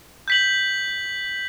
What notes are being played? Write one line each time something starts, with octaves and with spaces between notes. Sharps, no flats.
G6 B6 F#7